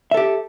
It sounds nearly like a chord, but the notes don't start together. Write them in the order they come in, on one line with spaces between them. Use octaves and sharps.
E5 A4 G4